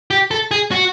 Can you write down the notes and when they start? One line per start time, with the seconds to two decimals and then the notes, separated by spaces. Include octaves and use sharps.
0.11 G4
0.31 A4
0.51 G#4
0.72 F#4